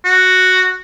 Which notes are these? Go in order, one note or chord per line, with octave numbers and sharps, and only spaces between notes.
F#4